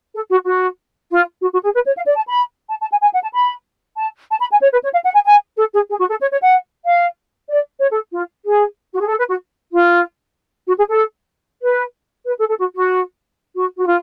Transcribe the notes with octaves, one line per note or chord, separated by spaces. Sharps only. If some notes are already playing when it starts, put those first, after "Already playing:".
A4
F#4
F#4
F4
F#4
F#4
G#4
B4
C#5
F5
D5
A5
B5
A5
A5
G#5
G#5
F#5
A5
B5
A5
A5
B5
G#5
C#5
B4
C#5
F5
F#5
G#5
G#5
A4
G#4
G#4
F#4
A4
C#5
C#5
F#5
F5
D5
C#5
A4
F4
G#4
F#4
G#4
A4
B4
F#4
F4
F#4
G#4
A4
B4
B4
A4
A4
F#4
F#4
F#4
F#4
F4